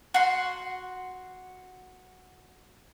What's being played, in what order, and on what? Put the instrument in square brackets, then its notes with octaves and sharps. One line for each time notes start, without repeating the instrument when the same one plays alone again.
[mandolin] F#4 C6